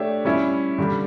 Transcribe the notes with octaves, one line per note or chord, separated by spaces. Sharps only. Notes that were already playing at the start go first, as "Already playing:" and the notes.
Already playing: A3 D4 G4 C#5 E5
G3 C#4 E4
G2 D3 G3 D4